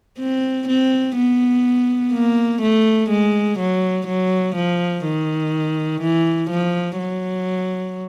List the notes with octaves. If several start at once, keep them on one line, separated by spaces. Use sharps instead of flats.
C4
C4
B3
A#3
A3
G#3
F#3
F#3
F3
D#3
E3
F3
F#3